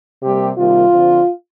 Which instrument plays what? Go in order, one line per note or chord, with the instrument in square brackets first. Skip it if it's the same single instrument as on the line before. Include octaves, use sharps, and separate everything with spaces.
[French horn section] C3 G3 A#3 G4
C3 D#3 G3 A#3 F4
D3 F3 C4